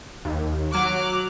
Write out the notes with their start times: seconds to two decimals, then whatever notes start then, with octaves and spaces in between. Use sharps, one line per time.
0.25 D#2
0.72 F#3 D6 F6 F#6